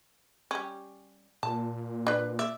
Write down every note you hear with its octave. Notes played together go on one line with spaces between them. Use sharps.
G3 C#4
A#2 A5
D4 B4
D5 E5